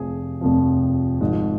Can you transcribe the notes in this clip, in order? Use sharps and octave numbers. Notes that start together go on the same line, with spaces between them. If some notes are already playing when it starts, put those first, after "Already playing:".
Already playing: F1 F2 C3 F3 G#4
F1 F2 C3 F3
G#1 G#2 F3